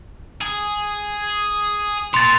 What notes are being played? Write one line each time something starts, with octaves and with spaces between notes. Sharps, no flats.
G#4
A#2 C6 A6